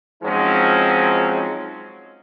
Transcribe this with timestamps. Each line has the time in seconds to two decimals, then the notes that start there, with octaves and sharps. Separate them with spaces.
0.23 F3 F#3 G#3 C4 C#4 D#4